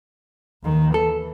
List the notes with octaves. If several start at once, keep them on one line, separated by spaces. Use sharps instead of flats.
D#2 D#3
E3 A4